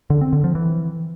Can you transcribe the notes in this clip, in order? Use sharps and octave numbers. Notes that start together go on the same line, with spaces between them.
D3
C4
D3
F3
E3